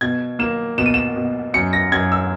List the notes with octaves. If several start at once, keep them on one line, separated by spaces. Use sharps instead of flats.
B2 G#6
A#3 E7
B2 E7
D#7
E7
B2
F#2 C#7
A#6
F#2 G#6
E6